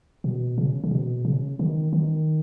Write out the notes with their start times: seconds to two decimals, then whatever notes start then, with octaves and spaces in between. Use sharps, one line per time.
0.24 B2
0.58 C#3
0.84 C#3
0.91 B2
1.25 C#3
1.59 D#3
1.93 D#3